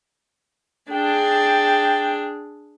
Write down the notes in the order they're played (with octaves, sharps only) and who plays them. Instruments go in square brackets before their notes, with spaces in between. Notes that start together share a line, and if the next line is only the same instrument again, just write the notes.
[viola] D4 G#4 [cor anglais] G5